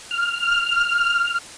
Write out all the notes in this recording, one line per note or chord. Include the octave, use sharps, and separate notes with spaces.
F6